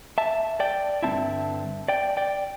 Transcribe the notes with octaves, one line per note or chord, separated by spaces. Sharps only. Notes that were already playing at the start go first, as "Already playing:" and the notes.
E5 A5
D5 G5
G2 D3 A3 C4 E4 E5 A5
D5 G5
D5 G5